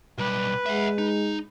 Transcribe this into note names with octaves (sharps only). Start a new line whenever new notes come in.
B1 G3 B4
G#3 E5 F#5
D#4